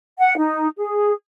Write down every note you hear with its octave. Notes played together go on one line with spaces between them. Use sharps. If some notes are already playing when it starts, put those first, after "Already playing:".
F#5
D#4
G#4